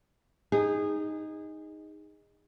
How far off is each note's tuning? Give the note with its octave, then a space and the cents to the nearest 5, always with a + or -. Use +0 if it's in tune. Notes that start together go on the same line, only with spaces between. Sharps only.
D#4 +0 G#4 -25